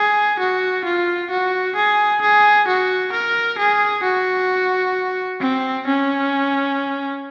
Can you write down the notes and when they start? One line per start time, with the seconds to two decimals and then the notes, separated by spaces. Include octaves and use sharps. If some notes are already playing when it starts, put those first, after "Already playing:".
Already playing: G#4
0.39 F#4
0.84 F4
1.30 F#4
1.76 G#4
2.21 G#4
2.67 F#4
3.13 A#4
3.58 G#4
4.03 F#4
5.41 C4
5.86 C#4